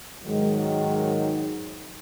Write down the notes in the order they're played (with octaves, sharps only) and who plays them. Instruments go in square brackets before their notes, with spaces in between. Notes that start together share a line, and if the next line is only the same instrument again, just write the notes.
[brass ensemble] G#2 D#3 F#3